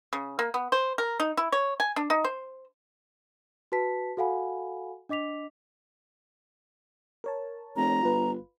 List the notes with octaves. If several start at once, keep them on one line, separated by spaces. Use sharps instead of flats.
C#3
A#3
B3
C5
A#4
D#4
E4
C#5
G#5
D4
D#4
C5
F#4 B4 A5 B6
F#4 A4 F5 F#5 G#5 B5
D4 D#5 D6 B6 F7
A#4 C#5 A5
F1 A#5
G1 F4 B4